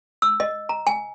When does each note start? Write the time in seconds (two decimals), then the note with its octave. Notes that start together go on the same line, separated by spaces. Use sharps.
0.22 E6
0.40 D#5
0.69 A#5
0.87 G#5